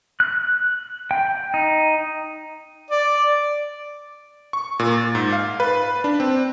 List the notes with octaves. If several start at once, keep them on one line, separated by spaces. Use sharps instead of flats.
F#6
G5
D#4
D5
C#6
A#2
A6
G#2
F5
B4
D4
C4